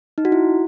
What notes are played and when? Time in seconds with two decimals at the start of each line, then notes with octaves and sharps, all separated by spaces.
0.18 D#4
0.25 F#4
0.32 E4